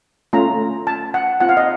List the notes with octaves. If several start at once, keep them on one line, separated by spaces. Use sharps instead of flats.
A3 C#4 F4 A#5
A5
F#5
C4 F4 F#5
F5
D#5